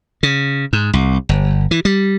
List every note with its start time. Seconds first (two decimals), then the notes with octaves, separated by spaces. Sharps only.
0.23 C#3
0.73 G#2
0.93 C2
1.29 G1
1.71 E3
1.85 G3